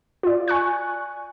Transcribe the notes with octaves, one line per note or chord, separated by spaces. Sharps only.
F4 D5
G#5 C#6 F#6